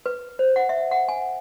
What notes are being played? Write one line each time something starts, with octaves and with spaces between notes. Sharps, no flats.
B4
C5
F#5
E5
F#5
G#5